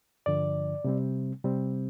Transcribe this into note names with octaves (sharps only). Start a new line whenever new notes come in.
G2 D3 F3 D5
C3 G3 C4
C3 G3 C4